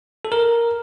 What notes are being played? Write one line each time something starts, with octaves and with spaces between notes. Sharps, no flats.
A4
A#4